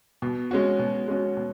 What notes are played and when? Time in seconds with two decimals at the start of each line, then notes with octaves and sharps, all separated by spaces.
0.22 B2
0.51 G#3 C#4 F#4
0.79 B2
1.08 G#3 C#4 F#4
1.37 B2